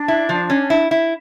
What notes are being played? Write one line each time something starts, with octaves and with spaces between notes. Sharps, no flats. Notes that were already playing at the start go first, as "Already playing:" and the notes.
Already playing: D4
E4
F3
C#4
E4
E4